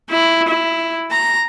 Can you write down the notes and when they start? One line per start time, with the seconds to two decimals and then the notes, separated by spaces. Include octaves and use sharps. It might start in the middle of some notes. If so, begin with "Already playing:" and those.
0.10 E4
0.48 E4
1.11 A#5